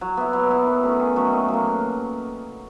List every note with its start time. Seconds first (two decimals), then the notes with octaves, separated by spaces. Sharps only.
0.01 F#3
0.17 B3 E4
0.33 F#3
0.50 B3 E4
0.66 D#3
0.83 F#3 A3 C#4
1.00 D#3
1.16 F#3 A3 C#4
1.33 D#3
1.48 F#3 A#3